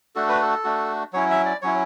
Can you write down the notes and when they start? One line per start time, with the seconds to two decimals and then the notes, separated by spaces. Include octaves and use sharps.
0.15 A3 D4 F#4 A4
0.29 B4
0.42 A4
0.64 A3 D4 F#4
1.13 F#3 C#4 E4 C#5
1.30 E5
1.46 D5
1.62 F#3 C#4 E4 C#5